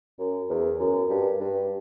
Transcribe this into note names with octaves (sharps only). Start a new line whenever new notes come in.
F#2
E2
F#2
G2
G2